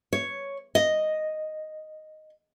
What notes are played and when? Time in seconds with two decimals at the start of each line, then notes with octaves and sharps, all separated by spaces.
0.13 C#5
0.75 D#5